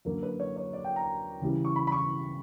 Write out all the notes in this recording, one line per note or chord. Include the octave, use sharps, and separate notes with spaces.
F#2 D3 F#3 A#3 A#4
B4
C#5
C#5
D5
G5
A#5
C#3 E3 G3
C#6
B5
B5
C#6